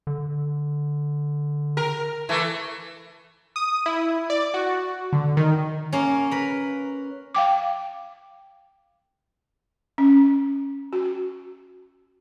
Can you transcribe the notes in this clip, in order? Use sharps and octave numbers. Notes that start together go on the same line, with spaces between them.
D3
A#4
E3 A3
D#6
E4
D5
F#4
D3
D#3
A#3 C#4
A#4 B4
F5 G5 D6
C#4
F#4